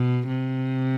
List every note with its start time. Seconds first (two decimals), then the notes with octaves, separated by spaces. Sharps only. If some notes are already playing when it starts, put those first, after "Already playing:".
Already playing: B2
0.27 C3